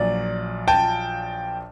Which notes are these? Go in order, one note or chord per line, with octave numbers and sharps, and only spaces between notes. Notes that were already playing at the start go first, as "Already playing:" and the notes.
Already playing: A#1 A#2 F#3 D5
G5 A5